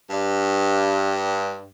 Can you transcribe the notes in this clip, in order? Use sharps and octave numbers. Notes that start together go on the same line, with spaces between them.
G2